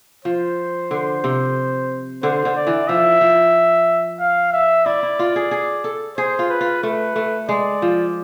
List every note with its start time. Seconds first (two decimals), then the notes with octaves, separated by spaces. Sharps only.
0.25 F3 C5
0.91 D3
1.24 C3
2.23 D3 C5
2.45 D3
2.56 D5
2.67 E3
2.88 F3 E5
3.21 F3
4.20 F5
4.53 E5
4.86 E4 D5
5.03 E4
5.19 F4
5.36 G#4
5.51 G#4
5.84 A4
6.17 G#4 C5
6.39 F4
6.50 B4
6.61 F4
6.83 A3 B4
7.16 A3
7.49 G#3 D5
7.82 F3